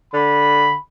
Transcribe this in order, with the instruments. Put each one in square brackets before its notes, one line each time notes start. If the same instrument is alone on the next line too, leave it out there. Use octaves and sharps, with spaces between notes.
[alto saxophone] D3 [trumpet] B5